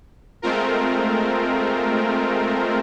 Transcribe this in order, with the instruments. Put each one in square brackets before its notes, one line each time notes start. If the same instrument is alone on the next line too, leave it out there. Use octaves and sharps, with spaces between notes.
[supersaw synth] G#3 A3 C4 F4 A#4